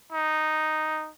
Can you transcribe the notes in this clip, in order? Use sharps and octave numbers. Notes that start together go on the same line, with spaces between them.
D#4